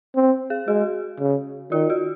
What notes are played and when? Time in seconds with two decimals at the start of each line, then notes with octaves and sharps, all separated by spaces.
0.15 C4
0.50 G#4
0.68 G#3 F#4
1.20 C#3
1.72 D#3 F4
1.90 F#4